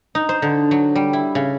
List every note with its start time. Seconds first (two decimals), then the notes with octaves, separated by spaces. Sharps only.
0.15 D#4
0.29 C5
0.42 D3
0.71 F#3
0.95 G3
1.13 E4
1.35 C#3